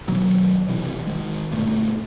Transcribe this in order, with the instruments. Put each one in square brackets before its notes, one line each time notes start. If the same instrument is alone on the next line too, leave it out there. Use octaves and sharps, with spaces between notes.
[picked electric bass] B2 D#3 F#3 A#3
B1 C3 E3
D#3 G#3
D2 G2 A#2 A3